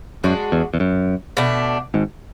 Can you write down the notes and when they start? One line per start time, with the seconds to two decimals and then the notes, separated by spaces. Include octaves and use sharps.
0.24 F#2 G#3 D4 F#4
0.52 E2
0.74 E2
0.80 F#2
1.37 B2 A3 D4
1.94 G#1 G#2